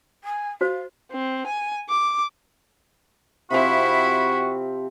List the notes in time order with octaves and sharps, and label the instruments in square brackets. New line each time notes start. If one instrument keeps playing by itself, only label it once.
[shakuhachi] G#5
[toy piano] F#4 C5 [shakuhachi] F5
[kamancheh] C4
G#5
D6
[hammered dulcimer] C3 F3 C4 [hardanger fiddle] E4 B5 [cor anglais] F#4